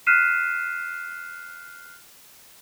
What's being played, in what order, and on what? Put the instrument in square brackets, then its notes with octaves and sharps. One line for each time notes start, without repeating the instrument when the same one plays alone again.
[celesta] F6 F#6 B6 C7 D#7 E7